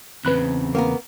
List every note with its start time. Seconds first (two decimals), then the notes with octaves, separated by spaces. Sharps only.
0.25 E2 A2 C#3 C4 B4 B5 F#6
0.75 A#3 B3 A#4